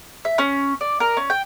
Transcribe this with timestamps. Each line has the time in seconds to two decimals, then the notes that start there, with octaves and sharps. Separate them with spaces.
0.25 E5
0.38 C#4
0.81 D5
1.00 A#4
1.17 C#4
1.30 G5